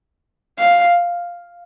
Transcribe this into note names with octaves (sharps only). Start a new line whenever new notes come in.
F5